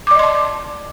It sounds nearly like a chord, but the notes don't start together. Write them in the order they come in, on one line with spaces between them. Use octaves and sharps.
D6 D5 D#5 C6 A5